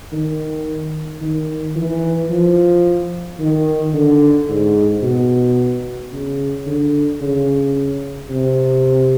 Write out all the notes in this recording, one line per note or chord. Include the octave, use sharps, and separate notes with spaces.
D#3
D#3
E3
F3
D#3
D3
G#2
B2
C#3
D3
C#3
C3